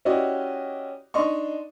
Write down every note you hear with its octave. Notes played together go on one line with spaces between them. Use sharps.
C#4 E4 F#4 G4 D5 D#5
D4 D#4 D#5 C6 C#6